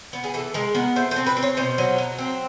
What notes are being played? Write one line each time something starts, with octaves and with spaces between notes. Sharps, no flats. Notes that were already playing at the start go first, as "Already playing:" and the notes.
B3
G#4
E3 A4
G#3 A#4
B3 A#4
A3 C5
C5
C4
B4
C4
C#5
B2 C5
F#3
F#3
C4